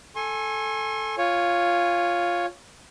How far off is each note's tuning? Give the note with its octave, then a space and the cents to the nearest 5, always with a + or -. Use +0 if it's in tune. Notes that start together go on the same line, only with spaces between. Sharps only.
A4 +0 G#5 +0 C6 +45
F4 +0 C#5 +0 G#5 -15